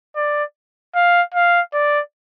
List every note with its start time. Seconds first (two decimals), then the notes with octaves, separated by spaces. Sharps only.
0.16 D5
0.95 F5
1.34 F5
1.73 D5